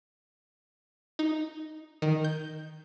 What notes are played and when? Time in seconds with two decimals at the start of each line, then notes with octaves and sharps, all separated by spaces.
1.19 D#4
2.02 D#3
2.24 G6